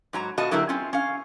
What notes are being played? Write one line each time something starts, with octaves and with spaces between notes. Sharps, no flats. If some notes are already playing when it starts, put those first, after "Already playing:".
G#2 F#3 A#5
B2 F4 F#4 D#5 A5
D3 F#3 A#3 E4 G4 A#4
C4 C#4 F4
C#4 F5